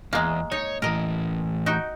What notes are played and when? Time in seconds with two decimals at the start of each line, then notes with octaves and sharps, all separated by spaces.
0.13 E2 G#3 A#3
0.52 D#4 C#5
0.82 A2 E3 A#4 D#5
1.66 D#4 F#4 G5